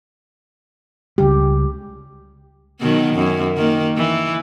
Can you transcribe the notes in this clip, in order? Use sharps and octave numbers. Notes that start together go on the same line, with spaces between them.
C#2 C#3 G3 G4
B2 D#3 F#3
F#2
D#3 A#3
E3